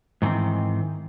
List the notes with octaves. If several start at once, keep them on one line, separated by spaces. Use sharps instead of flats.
G#2 D#3 E3 C4